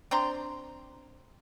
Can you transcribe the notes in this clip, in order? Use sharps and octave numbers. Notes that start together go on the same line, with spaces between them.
C4 D4 A#5 C6